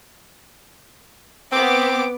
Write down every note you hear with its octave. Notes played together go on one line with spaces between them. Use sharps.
B3 C4 D6